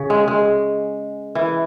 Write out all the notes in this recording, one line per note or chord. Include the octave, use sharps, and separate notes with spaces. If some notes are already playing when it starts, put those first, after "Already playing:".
Already playing: C#3
G#3
G#3
E3